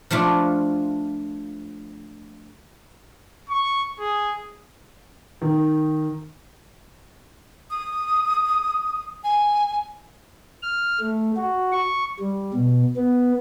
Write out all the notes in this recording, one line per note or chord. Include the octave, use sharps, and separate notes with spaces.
F3 A3 D4 F4
C#6
G#4
D#3
D#6
G#5
F6
A3
F#4
C#6
G3
B2
B3